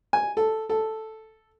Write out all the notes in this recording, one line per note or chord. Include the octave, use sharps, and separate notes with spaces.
G#5
A4
A4